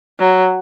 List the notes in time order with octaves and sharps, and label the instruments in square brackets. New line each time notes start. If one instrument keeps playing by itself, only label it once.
[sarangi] F#3